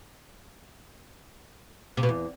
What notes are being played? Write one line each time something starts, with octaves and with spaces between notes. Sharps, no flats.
C3
B2
E2